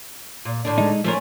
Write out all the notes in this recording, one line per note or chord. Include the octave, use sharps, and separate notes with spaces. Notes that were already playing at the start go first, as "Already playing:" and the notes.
A#2
A2 D3 D4
G#3 D#4
F3 A3 C4 C#4 A#4